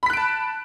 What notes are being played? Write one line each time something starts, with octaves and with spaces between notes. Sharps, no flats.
A5 B5 F#6 B6 D7